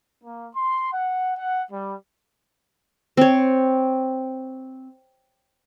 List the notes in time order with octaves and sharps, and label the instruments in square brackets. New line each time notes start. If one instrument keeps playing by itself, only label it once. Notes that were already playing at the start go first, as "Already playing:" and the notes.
[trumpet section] A#3
C6
F#5
F#5
G3
[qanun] C4 C#5